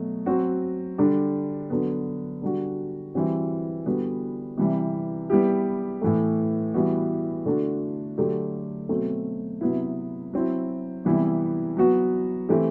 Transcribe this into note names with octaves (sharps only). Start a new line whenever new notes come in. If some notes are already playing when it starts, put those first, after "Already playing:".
Already playing: B2 F#3 A3
F#3 C4 F#4
D3 G3 D4
D3 F#3 B3
D3 G3 D4 F#4
E3 G3 C4 F#4
D3 G3 B3 F#4
C3 E3 G3
G3 B3 E4 G4
A2 E3 A3
E3 G3 B3 F#4
D3 A3 D4 F#4
D3 F#3 A3 D4 G4
B2 F#3 A3 C4
C3 F#3 B3 E4
F#3 C4 E4
C3 E3 G3 B3 E4
F#3 B3 F#4
E3 A3 C4 E4 G4